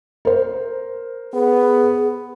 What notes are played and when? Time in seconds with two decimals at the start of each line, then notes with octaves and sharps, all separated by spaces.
0.25 A#4 C5
1.33 B3 G#4